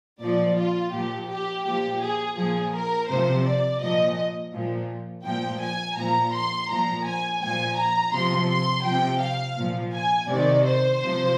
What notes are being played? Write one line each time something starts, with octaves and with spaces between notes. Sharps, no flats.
A#2 F3 D5
F4
A#2 F3 G4
G4
A#2 F3 G4
G#4
A#2 F3 G#4
A#4
C3 F3 C5
D5
A#2 F3 D#5
A#2 F3
A#2 F3 G5
G#5
A#2 F3 A#5
C6
A#2 F3 A#5
G#5
A#2 F3 G#5
A#5
C3 F3 C6
C6
C3 F3 G5
F5
A#2 F3
G#5
C3 D#3 D5
C5
C3 F3